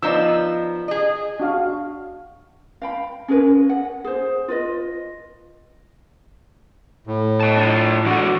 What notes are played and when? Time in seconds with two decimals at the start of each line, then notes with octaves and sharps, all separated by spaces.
0.03 F3 B3 D#4 D5 A#5 E6
0.88 G#4 D#5
1.40 D4 F#4 F5
2.82 F5 G5 B5
3.28 C#4 G#4 A#4 B4
3.69 F#5
4.04 G#4 C5
4.48 F4 B4 D#5
7.07 A2
7.40 D#5 A5
7.57 D4 F4
8.06 E3 G#3 F#4 D5